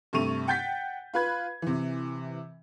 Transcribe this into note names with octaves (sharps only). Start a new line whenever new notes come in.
G2 C3 A3 C#6 D#7 F7
F#5 G5 G6 A6 B6
F4 B4 B5 G#6
C3 E3